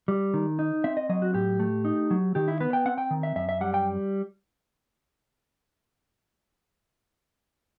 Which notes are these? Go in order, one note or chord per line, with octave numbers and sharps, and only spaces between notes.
G3
D#3
D#4
C4 E5
D#5
F#3 D#5
F#4
A2 G4
A3
D#4
F#3
D#3 G4
E4
B3 B4
G5
C4 F#5
G5
D#3
E5
F#2 E5
E5
G3 F#5
G5